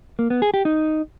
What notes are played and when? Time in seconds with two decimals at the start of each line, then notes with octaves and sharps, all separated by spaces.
0.19 A#3
0.30 B3
0.42 G#4
0.54 G4
0.65 D#4